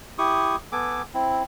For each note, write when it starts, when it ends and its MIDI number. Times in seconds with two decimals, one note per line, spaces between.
0.18 0.56 64
0.18 0.56 67
0.18 0.56 85
0.18 0.56 87
0.72 1.02 59
0.72 1.02 69
0.72 1.02 80
0.72 1.02 86
1.14 1.43 60
1.14 1.43 64